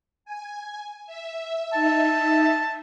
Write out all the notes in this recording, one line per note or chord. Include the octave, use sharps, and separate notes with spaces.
G#5
E5
D#4 E5 A5